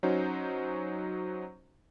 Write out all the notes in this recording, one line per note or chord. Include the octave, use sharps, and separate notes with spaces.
F#3 C#4 D#4 F#4 C5